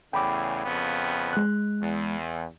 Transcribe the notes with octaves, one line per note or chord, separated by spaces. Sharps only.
E2 A2 C#3 G5 B5 D6
F2 C#3 B3
G#3 F#6
E2